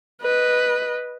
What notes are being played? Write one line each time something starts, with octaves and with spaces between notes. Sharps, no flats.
B4 D#5